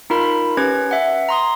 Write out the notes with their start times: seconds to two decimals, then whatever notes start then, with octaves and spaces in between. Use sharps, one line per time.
0.10 D#4 F4 A#4 B5
0.57 C#4 G4 B4 G#6
0.91 E5 F#5
1.29 A#5 C6 D#6